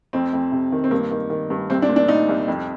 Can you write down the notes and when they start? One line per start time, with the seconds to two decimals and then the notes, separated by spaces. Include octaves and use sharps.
0.13 F2 C4
0.33 F2
0.52 C3
0.72 D#3
0.84 C4
0.91 G2 A#3
1.11 D#3
1.30 D#3
1.50 G2
1.70 C2 C4
1.82 D4
1.88 A#2
1.96 D4
2.08 A#2 D#4
2.29 C2
2.48 F2